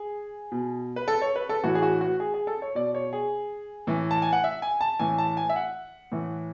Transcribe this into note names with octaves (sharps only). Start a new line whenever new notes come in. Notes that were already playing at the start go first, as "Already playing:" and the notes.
Already playing: G#4
B2
B4
A4
C#5
B4
A4
A2 E3 F#4
G#4
F#4
F#4
G#4
G#4
A4
C#5
B2 D5
C#5
G#4
A2 E3
A5
G#5
F#5
E5
G#5
A5
A2 E3 G#5
A5
G#5
E5
F#5
A2 E3